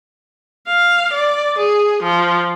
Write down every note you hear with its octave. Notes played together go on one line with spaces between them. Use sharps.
F5
D5
G#4
F3